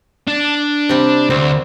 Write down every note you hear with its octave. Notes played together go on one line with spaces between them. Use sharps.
D4
C3 G3
D2 C4